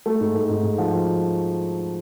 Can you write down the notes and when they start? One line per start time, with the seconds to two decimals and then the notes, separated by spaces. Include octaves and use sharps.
0.06 A3
0.20 G#2
0.35 A3
0.49 G#2
0.63 G#2
0.78 F3
0.93 F3